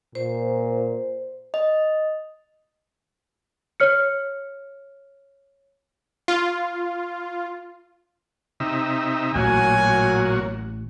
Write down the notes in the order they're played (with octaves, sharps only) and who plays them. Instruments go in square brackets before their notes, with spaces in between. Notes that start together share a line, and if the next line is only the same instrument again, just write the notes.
[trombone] A#2 [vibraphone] C5
[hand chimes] D#5
[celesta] C#5 F6 C#7
[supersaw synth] F4
[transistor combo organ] C3 D#4 E5
[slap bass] A1 [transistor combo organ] A#2 F#4 [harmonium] F#3 [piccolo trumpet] G#5